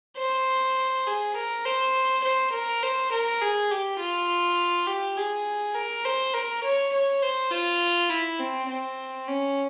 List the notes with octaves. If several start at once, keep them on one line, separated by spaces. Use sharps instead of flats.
C5
G#4
A#4
C5
C5
A#4
C5
A#4
G#4
G4
F4
G4
G#4
A#4
C5
A#4
C#5
C#5
C5
F4
E4
C4
C4
C#4